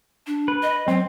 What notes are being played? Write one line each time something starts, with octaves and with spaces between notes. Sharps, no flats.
D4
B4
D#5
F#3 C4